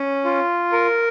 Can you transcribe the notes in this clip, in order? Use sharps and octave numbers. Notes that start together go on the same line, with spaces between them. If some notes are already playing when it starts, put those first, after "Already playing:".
Already playing: C#4
F4
A#4